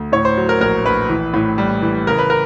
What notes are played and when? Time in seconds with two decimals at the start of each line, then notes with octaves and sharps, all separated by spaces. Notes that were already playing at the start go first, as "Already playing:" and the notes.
Already playing: D2
0.12 A2 C#5
0.25 C5
0.37 F#3
0.49 A#4
0.60 A#1 A#4
0.85 A#1 B4
1.09 E3
1.34 A2
1.58 G3
1.82 E3
2.07 C#3 A#4
2.18 B4
2.30 A#4